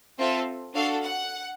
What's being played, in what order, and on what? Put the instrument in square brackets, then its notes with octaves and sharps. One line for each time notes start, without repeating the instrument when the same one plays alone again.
[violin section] C4 F4 A4 E5
D4 F#4 A4 F5
F#5